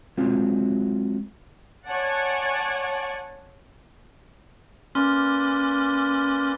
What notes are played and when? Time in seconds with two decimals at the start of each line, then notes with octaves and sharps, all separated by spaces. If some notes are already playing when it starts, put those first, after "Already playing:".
0.17 F#3 G#3 C4 F4
1.88 C#5 D5 F#5 G#5 A5
4.95 A#3 C#4 B4 D5 C6 F6